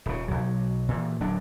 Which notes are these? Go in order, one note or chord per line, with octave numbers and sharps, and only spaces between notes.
D#1 C#3
B1 F#3
A#2 E3
D1 F#3 D4